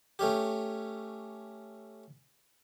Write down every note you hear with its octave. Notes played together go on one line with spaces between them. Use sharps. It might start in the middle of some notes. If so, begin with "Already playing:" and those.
A3 C#4 G4